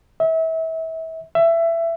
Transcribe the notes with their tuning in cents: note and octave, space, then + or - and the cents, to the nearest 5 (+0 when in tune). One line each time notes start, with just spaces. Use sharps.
E5 -30
E5 +20